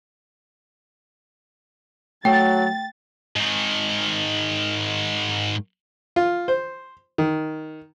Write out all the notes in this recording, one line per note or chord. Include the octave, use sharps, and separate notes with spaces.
F#3 A3 G5 A6
G#2 D#3
F4
C5
D#3